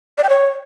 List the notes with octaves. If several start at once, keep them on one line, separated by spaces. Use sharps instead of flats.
D5
G5
C#5